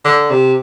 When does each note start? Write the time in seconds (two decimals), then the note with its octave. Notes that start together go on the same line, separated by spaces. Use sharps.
0.05 D3
0.31 C3